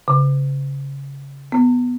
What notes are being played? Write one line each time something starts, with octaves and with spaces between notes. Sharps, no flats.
C#3
B3